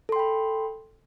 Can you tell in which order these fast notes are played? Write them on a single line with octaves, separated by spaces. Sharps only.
A4 C6 G5 B5